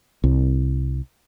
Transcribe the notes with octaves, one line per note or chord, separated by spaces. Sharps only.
C2